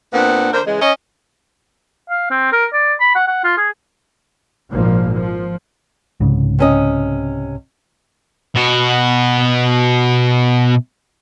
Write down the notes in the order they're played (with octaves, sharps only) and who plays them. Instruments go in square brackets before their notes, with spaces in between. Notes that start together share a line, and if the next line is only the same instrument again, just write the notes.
[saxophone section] A#2 B3 C4 D4 F#5
D3 A#3 A#4 C5
C#3 E3 G#3
C#4 D#5
[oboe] F5
C4
A#4
D5
B5
F#5
F#5
F4
G#4
[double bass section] G#1 A#2 F3 A#3
F3
[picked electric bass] C2 G#2 C#3
[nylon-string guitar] C3 C#4 D#5
[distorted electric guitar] B2 F#4